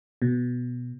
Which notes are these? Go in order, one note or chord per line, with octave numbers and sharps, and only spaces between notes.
B2